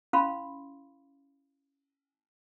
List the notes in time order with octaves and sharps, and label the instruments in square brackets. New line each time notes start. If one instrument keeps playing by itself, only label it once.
[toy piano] C#4 E4 F5 B5 C6